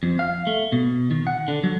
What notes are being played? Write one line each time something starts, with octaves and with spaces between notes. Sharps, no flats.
F2
F5
A3
B2
D#3
F#5
D3
F#3